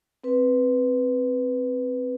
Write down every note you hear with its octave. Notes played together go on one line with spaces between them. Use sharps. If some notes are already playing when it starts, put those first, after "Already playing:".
C4 B4